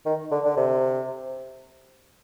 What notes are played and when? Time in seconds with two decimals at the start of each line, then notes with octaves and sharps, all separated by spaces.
0.06 D#3
0.31 D3
0.45 D3
0.57 C3